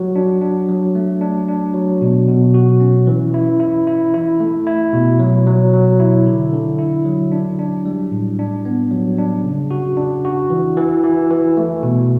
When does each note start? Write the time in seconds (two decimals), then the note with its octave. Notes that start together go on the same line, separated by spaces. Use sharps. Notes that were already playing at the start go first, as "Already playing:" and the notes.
Already playing: F#3 F#4
0.16 D4
0.42 D4
0.69 F#3
0.95 A3
1.21 D4
1.48 D4
1.74 F#3
2.01 B2
2.28 B2
2.54 F#4
2.80 C#4
3.07 E3
3.34 E4
3.60 E4
3.87 E4
4.14 E4
4.40 A3
4.67 E4
4.93 B2
5.19 F#3
5.47 F#3
5.73 F#3
6.00 E4
6.26 D3
6.53 D3
6.78 E4
7.05 F#3
7.32 D4
7.59 D4
7.86 G3
8.12 A2
8.39 D4
8.65 B3
8.91 F#3
9.18 D4
9.44 C#3
9.71 F#4
9.97 D4
10.25 F#4
10.50 E3
10.77 E3
11.03 E3
11.31 E3
11.57 A3
11.83 B2